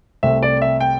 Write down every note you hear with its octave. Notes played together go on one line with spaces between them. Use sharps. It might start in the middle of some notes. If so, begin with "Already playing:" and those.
C2 C3 A3 C4 E5
D5
E5
G5